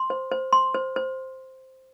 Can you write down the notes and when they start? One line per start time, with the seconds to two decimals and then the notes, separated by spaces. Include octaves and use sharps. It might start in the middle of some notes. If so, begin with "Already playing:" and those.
Already playing: C6
0.10 C5
0.32 C5
0.53 C6
0.74 C5
0.96 C5